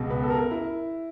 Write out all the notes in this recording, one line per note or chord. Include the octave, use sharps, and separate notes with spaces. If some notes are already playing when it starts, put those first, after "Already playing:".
Already playing: C#2 B2
B4
A4
A#4
E4